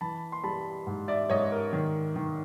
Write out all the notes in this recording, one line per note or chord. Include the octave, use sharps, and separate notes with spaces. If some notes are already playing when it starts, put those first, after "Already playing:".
E3 A5 B5
C6
G3 A5 B5
G#2
D5 E5
G#2 C#5 D#5
A#4
D#3
D#3